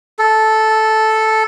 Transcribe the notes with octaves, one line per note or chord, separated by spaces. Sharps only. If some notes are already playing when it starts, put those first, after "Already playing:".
A4